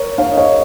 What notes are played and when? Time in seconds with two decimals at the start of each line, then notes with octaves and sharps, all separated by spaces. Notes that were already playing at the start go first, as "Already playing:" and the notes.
Already playing: A#4 C#5
0.18 C#5 F5
0.32 D#5
0.37 C#5 F5